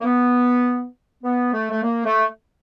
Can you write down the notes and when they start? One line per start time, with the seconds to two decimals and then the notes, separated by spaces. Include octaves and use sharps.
0.01 A#3
0.05 B3
1.23 B3
1.53 A3
1.71 A3
1.83 A#3
2.05 A3